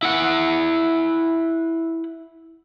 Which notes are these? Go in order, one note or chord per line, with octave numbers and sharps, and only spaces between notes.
E4 F#5